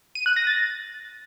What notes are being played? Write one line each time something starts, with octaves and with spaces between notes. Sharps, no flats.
D#7
F#6
A#6
A6